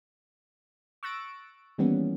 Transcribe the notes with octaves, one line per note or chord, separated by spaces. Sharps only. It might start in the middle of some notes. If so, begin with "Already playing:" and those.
C#6 E6 F#6 A6 A#6 D7
D#3 E3 G3 A#3 B3 C#4